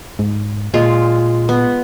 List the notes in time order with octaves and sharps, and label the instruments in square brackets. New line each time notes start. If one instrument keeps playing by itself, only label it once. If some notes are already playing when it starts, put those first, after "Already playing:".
[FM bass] G#2
[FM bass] A#2 [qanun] G#3 F4
[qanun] B3